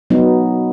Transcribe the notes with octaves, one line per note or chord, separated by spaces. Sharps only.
F#3 B3 D#4